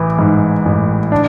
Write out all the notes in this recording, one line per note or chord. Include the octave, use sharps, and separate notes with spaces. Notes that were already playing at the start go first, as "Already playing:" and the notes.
Already playing: A1 E3
G#2
A1
D4